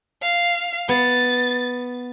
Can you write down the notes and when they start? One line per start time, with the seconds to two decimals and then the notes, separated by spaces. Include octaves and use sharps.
0.22 F5
0.89 B3 A6